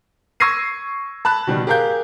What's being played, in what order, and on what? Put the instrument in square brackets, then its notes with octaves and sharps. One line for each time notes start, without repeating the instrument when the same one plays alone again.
[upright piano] C#6 E6 G#6 A#6 C7 D#7
A5 B5 F#6
B2 D#3 G3
G4 G#4 A#4 F5 G6